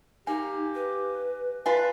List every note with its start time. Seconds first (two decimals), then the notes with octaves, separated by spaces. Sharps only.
0.27 A#3 D#4 G4 G#5
0.75 B4
1.66 D4 F4 B4 G#5